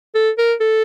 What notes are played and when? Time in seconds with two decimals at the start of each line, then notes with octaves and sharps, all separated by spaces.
0.15 A4
0.38 A#4
0.60 A4